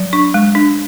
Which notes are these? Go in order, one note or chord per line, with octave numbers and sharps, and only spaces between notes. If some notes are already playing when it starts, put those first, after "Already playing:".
Already playing: F#3
D4 C#6
G#3
D4